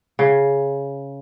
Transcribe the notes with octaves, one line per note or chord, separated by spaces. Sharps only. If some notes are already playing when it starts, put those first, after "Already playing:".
C#3